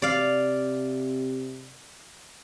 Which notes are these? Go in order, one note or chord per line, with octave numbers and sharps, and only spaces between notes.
C3 D5 F5